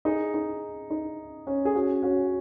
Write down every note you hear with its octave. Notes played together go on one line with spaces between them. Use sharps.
D#4 G#4
D#4
D#4
C#4
G#4
C#4 F#4
C#4 F#4